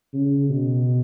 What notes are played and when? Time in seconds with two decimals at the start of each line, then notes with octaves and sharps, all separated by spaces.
0.14 C#3
0.49 B2